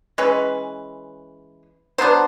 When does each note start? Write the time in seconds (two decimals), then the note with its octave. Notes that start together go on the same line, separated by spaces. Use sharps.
0.18 E3 G#3 C#4 B4
1.98 F#3 B3 D4 C5